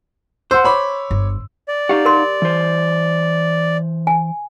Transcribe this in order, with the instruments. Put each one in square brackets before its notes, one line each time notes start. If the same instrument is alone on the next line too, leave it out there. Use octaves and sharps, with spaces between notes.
[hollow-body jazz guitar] C5 [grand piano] F#5 E6
[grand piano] C#5 B5 D6
[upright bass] G1
[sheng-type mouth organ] D5
[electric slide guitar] D#4 F5 F#5 [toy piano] G4
[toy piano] A#4 C6
[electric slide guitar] E3 C5
[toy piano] G#5